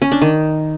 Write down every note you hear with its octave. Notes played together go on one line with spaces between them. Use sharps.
C#4
D4
D#3